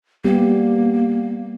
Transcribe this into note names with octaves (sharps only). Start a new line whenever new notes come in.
G3 A#3 B3 G4